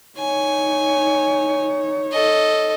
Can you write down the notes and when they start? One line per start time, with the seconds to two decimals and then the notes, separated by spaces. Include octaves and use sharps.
0.18 D#4 C#5 G#5
2.12 A4 D#5